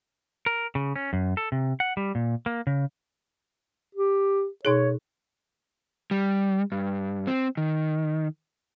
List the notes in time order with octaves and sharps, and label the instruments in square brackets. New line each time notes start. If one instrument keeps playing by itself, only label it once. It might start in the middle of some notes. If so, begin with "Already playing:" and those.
[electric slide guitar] A#4
C#3
C#4
F#2
A4
C3
F#5
G3
A#2
A#3
C#3
[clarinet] G4
[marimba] B2 D#4 G#4 [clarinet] C#5
[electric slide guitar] G3
G2
C4
D#3